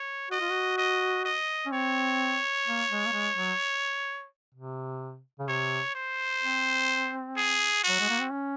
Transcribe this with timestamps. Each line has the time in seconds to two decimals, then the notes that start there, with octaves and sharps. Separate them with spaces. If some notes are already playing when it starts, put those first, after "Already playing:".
Already playing: C#5
0.30 F#4 D#5
0.41 F4
0.51 F#4
0.78 D#5
1.25 D#5
1.66 C#4
1.72 C4 C#5
2.67 A#3
2.90 G#3
3.06 A#3
3.13 G#3
3.36 F#3
4.55 C3
5.39 C#3
5.48 C3 C#5
5.95 C5
6.43 C4
7.37 G#4
7.84 F#4
7.89 F#3
8.00 G#3
8.10 A#3
8.20 C4
8.31 C#4